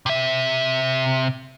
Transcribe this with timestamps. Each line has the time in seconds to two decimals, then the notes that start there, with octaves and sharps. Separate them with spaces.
0.06 C3 E5